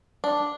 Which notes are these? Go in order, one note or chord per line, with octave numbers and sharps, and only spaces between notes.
D4